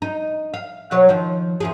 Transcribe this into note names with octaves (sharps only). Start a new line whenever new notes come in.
D#4
F5
B2 F#3 C#5
D#3 F3
E2 F3 G#4